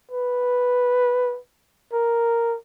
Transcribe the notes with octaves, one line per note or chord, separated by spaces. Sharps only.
B4
A#4